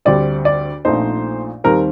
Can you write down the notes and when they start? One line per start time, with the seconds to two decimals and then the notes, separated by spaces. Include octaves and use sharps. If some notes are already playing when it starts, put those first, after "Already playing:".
0.05 D2 D3 G3 C4 D5
0.45 D5
0.85 A#1 A#2 A3 C4 D#4 C5
1.64 D#2 D#3 G3 C4 A#4